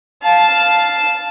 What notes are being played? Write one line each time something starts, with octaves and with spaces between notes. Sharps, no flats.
F5 A5